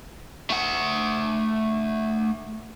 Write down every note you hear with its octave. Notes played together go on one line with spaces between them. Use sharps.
A3 F#5